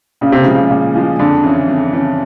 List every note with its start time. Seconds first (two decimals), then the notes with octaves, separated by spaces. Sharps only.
0.21 A#2 C#3
0.32 C3
0.43 C#3 F3 G#3
0.71 A#2
0.95 F3 G#3
1.19 F2 D3
1.43 C#3 E3
1.68 F2
1.93 C#3 E3